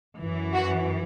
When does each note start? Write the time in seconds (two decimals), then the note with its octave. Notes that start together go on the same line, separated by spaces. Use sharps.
0.18 F#2 E3
0.55 F#4